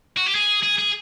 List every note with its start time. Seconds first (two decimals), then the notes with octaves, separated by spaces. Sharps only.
0.17 F#4
0.26 G4
0.35 G#4
0.63 G#4
0.79 G#4